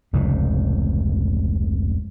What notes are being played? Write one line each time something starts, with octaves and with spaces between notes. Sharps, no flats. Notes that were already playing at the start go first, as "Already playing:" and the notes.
F1 C#2 G#2